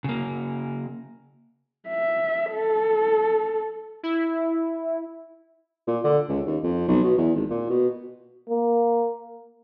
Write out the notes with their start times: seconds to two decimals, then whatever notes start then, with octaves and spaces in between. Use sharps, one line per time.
0.04 C#3 A#3
1.89 E5
2.53 A4
4.03 E4
5.87 A#2
6.04 D3
6.29 C#2
6.46 D#2
6.63 F2
6.88 B1
7.03 B2
7.17 E2
7.35 G#1
7.50 A#2
7.69 B2
8.49 A#3